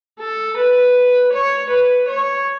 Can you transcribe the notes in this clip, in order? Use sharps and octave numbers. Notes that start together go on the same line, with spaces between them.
A4
B4
C#5
B4
C#5